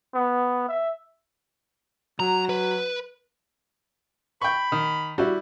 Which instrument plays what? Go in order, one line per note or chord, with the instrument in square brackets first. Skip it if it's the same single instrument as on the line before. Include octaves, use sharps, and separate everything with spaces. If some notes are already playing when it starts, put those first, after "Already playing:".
[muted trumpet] B3
E5
[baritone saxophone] F#3 [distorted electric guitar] A#5
[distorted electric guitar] B4
[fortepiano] G5 C#6 [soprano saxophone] B5
[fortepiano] D#3
[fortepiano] G3 E4 [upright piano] F#4